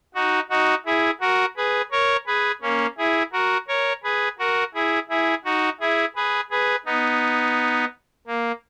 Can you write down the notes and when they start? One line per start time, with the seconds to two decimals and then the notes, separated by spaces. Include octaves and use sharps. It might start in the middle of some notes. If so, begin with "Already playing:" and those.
0.15 D#4 F#4
0.50 D#4 F#4
0.85 E4 G#4
1.21 F#4 A#4
1.56 G#4 B4
1.91 A#4 C#5
2.26 G#4 B4
2.62 A#3 C#4
2.97 E4 G#4
3.32 F#4 A#4
3.68 A#4 C#5
4.03 G#4 B4
4.39 F#4 A#4
4.74 E4 G#4
5.09 E4 G#4
5.44 D#4 F#4
5.80 E4 G#4
6.15 G#4 B4
6.50 G#4 B4
6.85 B3 D#4
8.27 A#3